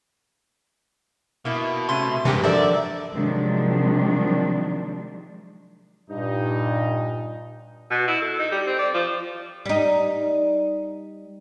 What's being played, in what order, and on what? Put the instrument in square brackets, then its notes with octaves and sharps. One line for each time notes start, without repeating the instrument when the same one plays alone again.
[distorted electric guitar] B2 [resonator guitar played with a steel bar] A#3 E4
[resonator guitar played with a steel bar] C3 A3 C#4 [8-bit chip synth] C6
[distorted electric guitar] G2 G#3 [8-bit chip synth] C3 E3 [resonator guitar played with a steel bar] A#3 C4 G4
[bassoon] D3 [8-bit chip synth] F3 [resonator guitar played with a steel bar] A#4 E5 [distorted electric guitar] D5
[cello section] C3 D#3 F3 F#3 G#3 D4
[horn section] G2 D#4 [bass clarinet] A#2
[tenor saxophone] B2
E4
A4
D#4
G3
C4
D5
F3
[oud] G3 D#4